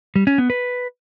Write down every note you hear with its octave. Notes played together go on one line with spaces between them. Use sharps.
G3
C#4
B3
B4